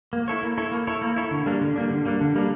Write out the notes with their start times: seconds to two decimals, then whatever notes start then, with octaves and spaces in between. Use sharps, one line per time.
0.13 A#3
0.28 E4 A4 C#5
0.43 A#3
0.58 E4 A4 C#5
0.72 A#3
0.87 E4 A4 C#5
1.02 A#3
1.16 E4 A4 C#5
1.31 D3
1.46 G3 A#3 D4
1.61 D3
1.76 G3 A#3 D4
1.90 D3
2.05 G3 A#3 D4
2.21 D3
2.35 G3 A#3 D4